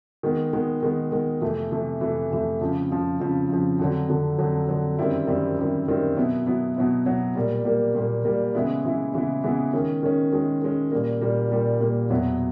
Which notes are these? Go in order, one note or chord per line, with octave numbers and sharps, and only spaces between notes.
D#3 G#3 B3
D#3 G#3 B3
D#3 G#3 B3
D#3 G#3 B3
F2 C3 E3 A3
F2 C3 E3 A3
F2 C3 E3 A3
F2 C3 E3 A3
F2 C#3 F3
F2 C#3 F3
F2 C#3 F3
F2 C#3 F3
F2 D3 F#3
F2 D3 F#3
F2 D3 F#3
F2 D3 F#3
F#2 D#3 G3 C4 E4
F#2 D#3 G3 C4 E4
F#2 D#3 G3 C4 E4
F#2 D#3 G3 C4 E4
B2 F#3 B3 E4
B2 F#3 B3 E4
B2 F#3 B3 E4
B2 F#3 B3 E4
A#2 G3 A#3
A#2 G3 A#3
A#2 G3 A#3
A#2 G3 A#3
C#3 E3 G#3 B3 E4
C#3 E3 G#3 B3 E4
C#3 E3 G#3 B3 E4
C#3 E3 G#3 B3 E4
D#3 G#3 C#4
D#3 G#3 C#4
D#3 G#3 C#4
D#3 G#3 C#4
A#2 G3 A#3
A#2 G3 A#3
A#2 G3 A#3
A#2 G3 A#3
E2 B2 F#3 B3 E4